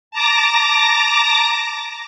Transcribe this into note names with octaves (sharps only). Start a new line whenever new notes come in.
A5 A#5 D6 A#6